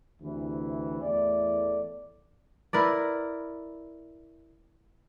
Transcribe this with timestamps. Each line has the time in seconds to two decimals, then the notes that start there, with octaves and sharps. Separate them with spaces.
0.21 D2 C3 E3
1.01 E2 A2 A3 D5
2.73 E4 A#4 B4 D5